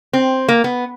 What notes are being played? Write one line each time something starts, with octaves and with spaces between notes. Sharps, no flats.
C4
A#3
B3